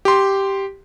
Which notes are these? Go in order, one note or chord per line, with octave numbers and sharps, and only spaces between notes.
G4 C6